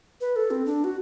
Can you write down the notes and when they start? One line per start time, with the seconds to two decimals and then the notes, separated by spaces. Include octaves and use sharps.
0.21 B4
0.36 A4
0.51 C4
0.66 D4
0.84 F#4